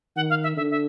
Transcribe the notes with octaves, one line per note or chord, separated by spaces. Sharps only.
D#3 F#5
F5
E5
D3 E5
E5